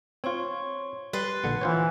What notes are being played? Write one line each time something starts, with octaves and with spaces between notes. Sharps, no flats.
C4 F4 C#5 C6 C#6
G3 B4 C6 A6 C7
A#1 D3 F#5
E3 F4 C5 C#5